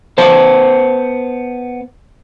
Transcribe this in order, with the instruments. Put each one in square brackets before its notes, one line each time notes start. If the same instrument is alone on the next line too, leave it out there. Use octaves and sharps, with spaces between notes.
[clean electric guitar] B3 C5 A5